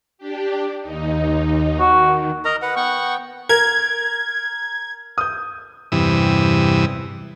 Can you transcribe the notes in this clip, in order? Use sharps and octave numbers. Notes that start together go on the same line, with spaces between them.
D4 G4
D#2 D#4
D#3 F#4
A#4 D#5 A#5
B4 F#5
B3 F#5 G5 C#6
A#4 G#6
D#6 G6
E2 G2 C3 E3 D#6 E6